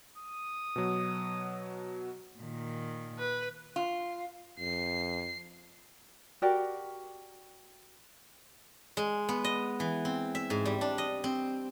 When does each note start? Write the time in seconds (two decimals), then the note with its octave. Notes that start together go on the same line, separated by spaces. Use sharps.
0.18 D#6
0.76 B2 F#3
2.39 A#2 D#3
3.18 B4
3.76 F4
4.60 F2 C7
6.42 F#4 G4 A#4 D5
8.97 G#3
9.29 B3
9.44 D#5
9.80 E3
10.05 C4
10.35 E5
10.50 G#2
10.65 G3
10.81 D4
10.98 D#5
11.24 C4